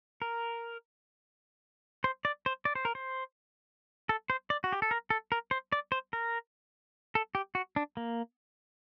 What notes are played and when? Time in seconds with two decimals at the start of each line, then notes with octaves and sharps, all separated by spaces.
0.22 A#4
2.04 C5
2.25 D5
2.46 C5
2.65 D5
2.75 C5
2.85 A#4
2.95 C5
4.09 A4
4.30 C5
4.50 D5
4.64 F#4
4.72 G4
4.82 A4
4.91 A#4
5.10 A4
5.32 A#4
5.51 C5
5.72 D5
5.92 C5
6.13 A#4
7.15 A4
7.35 G4
7.55 F#4
7.76 D4
7.97 A#3